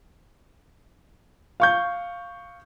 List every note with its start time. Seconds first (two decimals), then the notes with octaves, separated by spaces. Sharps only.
1.60 F5 C#6 G6